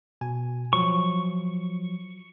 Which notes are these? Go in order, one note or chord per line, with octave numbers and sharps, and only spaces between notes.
B2 G#5
F3 F#3 C#6